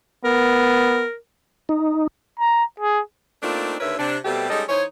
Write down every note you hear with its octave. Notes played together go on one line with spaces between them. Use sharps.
B3 A#4
D#4
A#5
G#4
A3 A#3 C4 D4 D#4 F4
D#2 D3 A#4 B4 C#5 E5
C3 D4
B2 G3 A3 C4 G4 A4
G3 G#3 C#4 D#4 A4 D#5
E3 D#4 C5 C#5